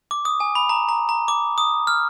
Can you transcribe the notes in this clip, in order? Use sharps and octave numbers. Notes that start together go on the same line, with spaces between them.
D6
D#6
G#5
B5
A#5
A#5
A#5
D6
D#6
F6